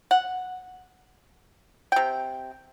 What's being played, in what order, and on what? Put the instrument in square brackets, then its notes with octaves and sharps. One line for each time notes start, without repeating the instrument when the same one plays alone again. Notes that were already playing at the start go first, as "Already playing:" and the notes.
[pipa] F#5
C3 G5